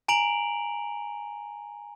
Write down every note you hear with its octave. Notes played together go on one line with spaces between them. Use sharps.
G#5 A#5 D7 F7 F#7